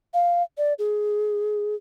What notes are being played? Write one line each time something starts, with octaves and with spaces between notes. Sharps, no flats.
F5
D5
G#4